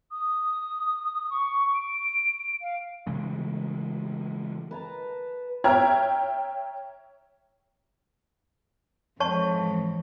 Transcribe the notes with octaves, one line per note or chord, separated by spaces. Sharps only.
D#6
C#6
D7
F5
C#3 E3 G#3 A3
B4 A5 A#5
C#5 E5 G5 A#5 F6 G#6
F2 G#2 E3 C#5 A5 C#6